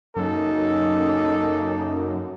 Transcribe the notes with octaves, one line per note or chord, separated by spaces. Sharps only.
F#2 C#3 A#3 D#4 A4